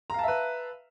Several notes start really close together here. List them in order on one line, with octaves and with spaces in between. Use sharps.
A#5 F5 A5 E5 B4